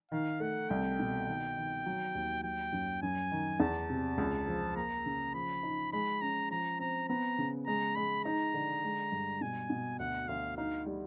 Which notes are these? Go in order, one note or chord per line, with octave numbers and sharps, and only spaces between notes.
D#3 F5
A3 F#5
C2 G5
B2
D#3
D#3
F#3
D#2
F#3 G5
F#2
F#2 G#5
D#3
E2 A5
C3
C#2
F3
A#3 A#5
C#3
F3 B5
D#4
G#3 B5
C#4 A#5
F3 A#5
C4 A#5
B3 A#5
C#3
G#3 A#5
G#3 B5
D#4 A#5
D3
G#3
G2
B2 G#5
B2
D2 F#5
D2 F5
D#4 F5
G3